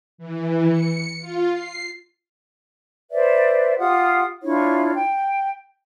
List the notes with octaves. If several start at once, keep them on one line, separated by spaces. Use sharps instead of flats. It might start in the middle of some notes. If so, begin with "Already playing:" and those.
E3
C#7
F4
C7
B4 C5 D5 E5
F4 G4 F#5 D#6
D4 E4 F4 C#5
G5